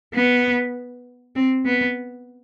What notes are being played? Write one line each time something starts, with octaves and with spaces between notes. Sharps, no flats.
B3
C4
B3